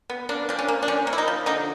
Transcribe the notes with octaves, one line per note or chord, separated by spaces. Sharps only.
B3
A#3 D4
F3 D4
C#4
A#3
D4
F3 C#4
A#3
E4
D#4
F3
D3 D#4